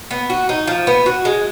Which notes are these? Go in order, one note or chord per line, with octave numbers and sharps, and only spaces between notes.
B3
F#4
D#4
F3
B3
F#4
G#3